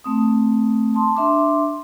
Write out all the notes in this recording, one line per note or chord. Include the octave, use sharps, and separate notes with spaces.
A3 C4 D#6
A5 C6
D4 E5 C6 D6